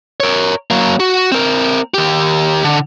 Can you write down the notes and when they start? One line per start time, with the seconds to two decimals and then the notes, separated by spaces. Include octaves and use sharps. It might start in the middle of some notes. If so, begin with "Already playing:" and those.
0.20 A#4 C#5
0.71 F#3 A#3
1.00 F#4
1.32 C4 A#4
1.94 D#3 G4
2.64 D3